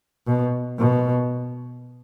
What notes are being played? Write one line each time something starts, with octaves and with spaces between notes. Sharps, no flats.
B2
B2